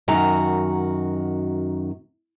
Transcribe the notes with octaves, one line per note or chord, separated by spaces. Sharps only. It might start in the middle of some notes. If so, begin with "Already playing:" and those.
F#2 D#3 F#4 A#5